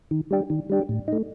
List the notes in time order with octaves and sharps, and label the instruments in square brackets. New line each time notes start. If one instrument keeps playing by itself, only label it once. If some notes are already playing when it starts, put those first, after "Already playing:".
[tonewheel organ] D#3
G3 D4 G4
D#3
G3 D4 G4
A2
A3 D#4